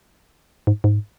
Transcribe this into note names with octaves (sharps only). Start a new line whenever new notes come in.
G#2
G#2